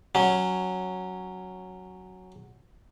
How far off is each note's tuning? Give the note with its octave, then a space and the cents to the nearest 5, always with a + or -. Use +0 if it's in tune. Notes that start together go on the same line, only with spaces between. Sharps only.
F#3 +0 C#4 +0